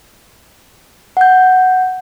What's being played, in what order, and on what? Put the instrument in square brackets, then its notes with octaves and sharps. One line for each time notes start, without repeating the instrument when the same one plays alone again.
[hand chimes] F#5 G6